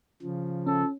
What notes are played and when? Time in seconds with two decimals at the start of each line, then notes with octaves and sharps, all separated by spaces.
0.23 C#3 F3
0.67 C#4 A4